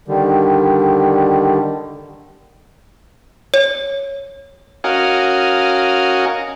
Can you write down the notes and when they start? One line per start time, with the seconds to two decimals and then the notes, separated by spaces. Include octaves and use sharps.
0.08 D3 D#3 G3
3.54 C#5
4.84 C#4 F#4 A#4 D#5 F5 G#5